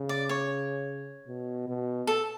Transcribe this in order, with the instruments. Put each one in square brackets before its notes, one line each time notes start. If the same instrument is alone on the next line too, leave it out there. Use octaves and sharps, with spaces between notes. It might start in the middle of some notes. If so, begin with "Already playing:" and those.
Already playing: [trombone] C#3
[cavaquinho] D5
C#5
[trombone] B2
B2
[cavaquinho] A4